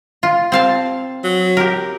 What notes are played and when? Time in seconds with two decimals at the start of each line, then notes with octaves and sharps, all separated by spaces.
0.23 F4
0.52 C4 F5 A5
1.24 F#3
1.57 G4 A#4